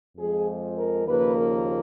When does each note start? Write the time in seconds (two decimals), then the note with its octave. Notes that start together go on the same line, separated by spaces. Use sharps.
0.18 F2 F3 G#3 G#4
0.76 A#4
1.05 D#2 C#3 F3 A#3 B4
1.35 A#4